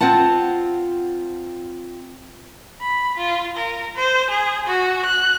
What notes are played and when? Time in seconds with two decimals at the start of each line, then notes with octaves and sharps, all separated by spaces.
0.01 C4 F4 C5 F#5 A5
2.81 B5
3.18 F4
3.56 A#4
3.95 C5
4.30 G#4
4.67 F#4
5.05 F#6